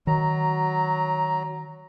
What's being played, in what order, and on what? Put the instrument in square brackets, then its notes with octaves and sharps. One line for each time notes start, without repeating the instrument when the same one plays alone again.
[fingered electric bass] D#3 [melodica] F#3 A#5